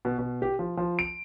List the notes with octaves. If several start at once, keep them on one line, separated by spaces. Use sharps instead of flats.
B2
B2
G4
F3
F3
D7